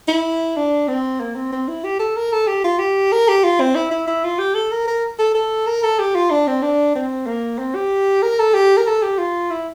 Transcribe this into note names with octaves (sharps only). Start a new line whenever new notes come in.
E4
D4
C4
A#3
C4
C4
E4
G4
A4
A#4
A4
G4
F4
G4
A#4
G4
F4
C4
E4
E4
E4
F4
G4
A4
A#4
A#4
A4
A4
A#4
A4
G4
F4
D4
C4
D4
C4
A#3
C4
G4
A#4
A4
G4
A#4
A4
G4
F4
E4